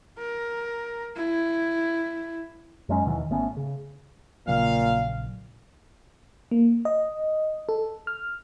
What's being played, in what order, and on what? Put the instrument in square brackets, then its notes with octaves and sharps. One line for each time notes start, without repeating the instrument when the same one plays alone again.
[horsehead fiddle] A#4
E4
[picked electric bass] F#2 F#3 G#3 C#4
D#2 B2 D#3 E3
G#1 A3 B3 C#4
C#3
[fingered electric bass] A#1 C#3 F#3 [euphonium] A#2 [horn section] F5
[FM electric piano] A#3
D#5
A4
F6